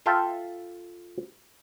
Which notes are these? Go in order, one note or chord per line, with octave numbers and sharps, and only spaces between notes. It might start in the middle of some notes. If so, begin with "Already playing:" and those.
F4 A4 E5 F5 G5